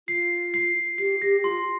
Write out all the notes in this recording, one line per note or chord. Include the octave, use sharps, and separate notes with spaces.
F4 C7
C7
G4 C7
G4 A#6
F4 C6